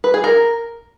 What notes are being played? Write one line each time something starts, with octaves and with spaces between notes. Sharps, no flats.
B4
G#4
A#4